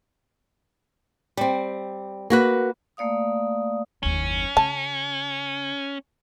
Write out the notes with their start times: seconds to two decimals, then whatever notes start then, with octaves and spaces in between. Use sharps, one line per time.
1.37 G3 C4
2.30 A#3 F#4 B4
2.97 A3 A#3 D5 F5 D#6
4.03 F#1 D#2 C#4
4.57 C#3 A5